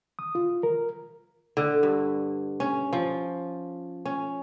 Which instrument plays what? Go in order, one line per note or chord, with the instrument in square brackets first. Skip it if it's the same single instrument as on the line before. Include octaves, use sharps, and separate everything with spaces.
[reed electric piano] D#6
F4
A#4
[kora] D3
G2
C#4
F3
C#4